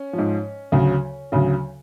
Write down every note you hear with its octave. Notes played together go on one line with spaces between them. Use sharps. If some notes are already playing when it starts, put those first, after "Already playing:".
Already playing: C#4
F3
G#2
D2 C#3 F#3
D2 C#3 F#3